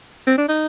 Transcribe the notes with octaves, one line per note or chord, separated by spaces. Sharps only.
C4
D4
D#4